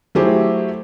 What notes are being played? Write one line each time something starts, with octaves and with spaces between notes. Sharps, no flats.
F#3 A3 E4 G4 G#4 C5